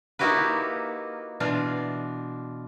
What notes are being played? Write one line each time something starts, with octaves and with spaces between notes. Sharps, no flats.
A#3 D#4 E4 F#4 G4 B4
B2 E3 D4 F4 F5